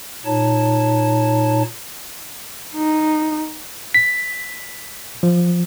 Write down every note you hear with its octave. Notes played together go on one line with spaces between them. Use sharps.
A#2 D#4 C#5 A5
D#4
B6
F3